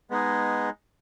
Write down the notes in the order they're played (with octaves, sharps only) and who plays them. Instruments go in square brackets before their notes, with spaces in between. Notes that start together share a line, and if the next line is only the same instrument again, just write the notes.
[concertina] G#3 B3 D#4 G#4